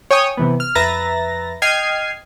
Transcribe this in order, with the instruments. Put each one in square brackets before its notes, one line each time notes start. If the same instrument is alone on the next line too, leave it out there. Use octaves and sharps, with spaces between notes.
[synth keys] C#5 G5 G#5 C#6 D#6
C3 E3 B3
F6
F2 B4 E5 A#5 A6 A#6
D#5 G5 F6 G#6 C7 D#7